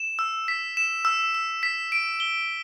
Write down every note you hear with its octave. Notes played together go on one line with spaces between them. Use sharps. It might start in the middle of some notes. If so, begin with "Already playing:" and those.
Already playing: E7
E6
B6
E7
E6
E6
B6
D7
G7